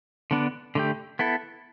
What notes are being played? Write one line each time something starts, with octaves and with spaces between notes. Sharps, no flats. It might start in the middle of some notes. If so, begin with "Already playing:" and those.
D3 B3 D4
D3 A3 G4
B3 E4 A4